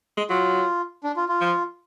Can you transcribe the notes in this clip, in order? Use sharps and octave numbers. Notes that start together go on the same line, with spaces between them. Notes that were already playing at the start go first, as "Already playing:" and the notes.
G#3
F#3 F4
D4
F4
F4
F3